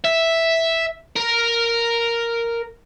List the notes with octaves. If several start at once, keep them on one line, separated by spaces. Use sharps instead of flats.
E5
A#4